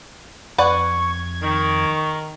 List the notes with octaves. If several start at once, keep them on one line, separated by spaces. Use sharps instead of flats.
F2 B4 D5 F#5 C#6 G#6
D#3 C#6